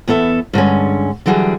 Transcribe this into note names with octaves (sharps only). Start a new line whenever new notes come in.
E2 B3 A4 E5
G2 D3 G#3 C#4
D3 E3 F#3 G3 G#4